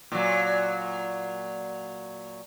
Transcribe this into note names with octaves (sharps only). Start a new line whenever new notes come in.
A#2 F#3